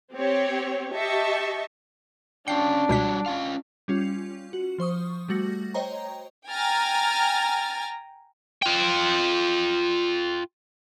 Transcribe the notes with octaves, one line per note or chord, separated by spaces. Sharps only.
C4 G4 C#5
G4 D#5 E5 A5 C#6
C#4 D4 F5 G5 C7
C#2 B2 G3 F#4 B6
C#4 F4 F5
G3 C#4 F4
F#4
F3 C5 C#6 D#6
G3 A3 F#4 A#6
C5 C#5 D#5 G5 A#5
G5 G#5 A#5 F6 A6
F4 G5